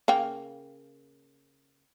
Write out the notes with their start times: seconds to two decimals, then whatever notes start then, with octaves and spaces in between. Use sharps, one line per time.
0.08 C#3 A#3 G5